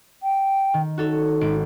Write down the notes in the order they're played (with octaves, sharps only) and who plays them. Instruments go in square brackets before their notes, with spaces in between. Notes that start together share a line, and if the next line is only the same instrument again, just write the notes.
[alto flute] G5
[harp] D#3
[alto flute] D#4 [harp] F#4 A4 C#5
[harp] G#1 D7